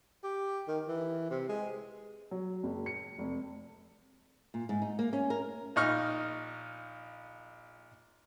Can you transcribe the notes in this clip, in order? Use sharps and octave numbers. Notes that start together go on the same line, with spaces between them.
G4
D#3
E3
C3
G#3
F#3
F#1
C#7
F1
A#2
G#2
D#4
A#3
C#4
A#4
A#1 D#4 C#6 F6